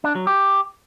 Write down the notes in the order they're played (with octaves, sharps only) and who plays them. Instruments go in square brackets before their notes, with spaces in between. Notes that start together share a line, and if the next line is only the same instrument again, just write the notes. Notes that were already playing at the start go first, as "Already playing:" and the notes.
[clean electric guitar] D4
F#3
G4